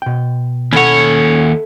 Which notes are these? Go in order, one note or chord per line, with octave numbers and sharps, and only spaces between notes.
B2 G5
D#2 A3 C#4 E4 C#5 F#5